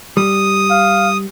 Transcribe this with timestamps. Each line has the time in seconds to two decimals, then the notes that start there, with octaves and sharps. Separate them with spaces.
0.17 G3 D#6
0.70 F5